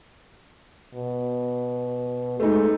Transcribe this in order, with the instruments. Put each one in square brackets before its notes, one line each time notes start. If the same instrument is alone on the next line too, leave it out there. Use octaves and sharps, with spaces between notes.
[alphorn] B2
[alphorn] G#3 [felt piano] A3 D#4